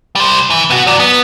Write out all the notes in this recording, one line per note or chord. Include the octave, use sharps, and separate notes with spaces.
G3 C5
E3
B3 F#4
F#3 D5
B3